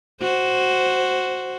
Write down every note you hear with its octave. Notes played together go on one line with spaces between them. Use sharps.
F#4 C5